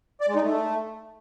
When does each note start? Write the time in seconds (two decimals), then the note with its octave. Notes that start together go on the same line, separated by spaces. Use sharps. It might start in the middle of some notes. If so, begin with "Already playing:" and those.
0.21 D5
0.28 G#3
0.35 D#4
0.43 A3